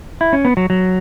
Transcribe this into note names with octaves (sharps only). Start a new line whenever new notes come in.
E4
C#4
B3
F#3
F#3